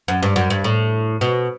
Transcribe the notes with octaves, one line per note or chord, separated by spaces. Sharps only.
F#2
G2
F#2
G2
A2
B2